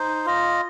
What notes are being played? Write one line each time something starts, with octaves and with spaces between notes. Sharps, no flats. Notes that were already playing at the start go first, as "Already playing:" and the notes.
Already playing: D#4 C5
F4 D#5